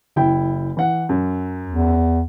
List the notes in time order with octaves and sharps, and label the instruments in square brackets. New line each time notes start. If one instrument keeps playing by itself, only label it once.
[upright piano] F#1 E4 G5
E3 F#5
F#2
[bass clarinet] E2